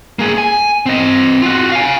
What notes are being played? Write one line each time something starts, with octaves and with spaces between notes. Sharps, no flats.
A#3 G#4
G#5
C4 D#5
F4 F#4
F5 G#5